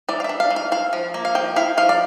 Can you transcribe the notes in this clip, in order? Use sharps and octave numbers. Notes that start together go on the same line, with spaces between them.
E3 D5
F5
D4 E5
F5
E3
F5
E4 F5
F3
A#3
F5
F3 G5
E4 F5
F3 F5
D5